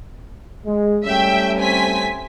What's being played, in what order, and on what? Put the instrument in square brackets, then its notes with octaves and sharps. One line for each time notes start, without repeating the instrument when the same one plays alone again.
[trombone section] G#3
[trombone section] G3 A3 C#4 [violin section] E5 G5
[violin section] C4 G#5 B6